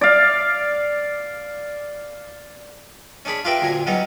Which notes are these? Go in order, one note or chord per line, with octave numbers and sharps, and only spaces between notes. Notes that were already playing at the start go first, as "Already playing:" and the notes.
D5 F5
C#4 D4 G#4 B5
F4 G4 A#4 B4 E5 G5
D2 A#2 G#5 A#5
F#3 G3 B3 C#4 D#4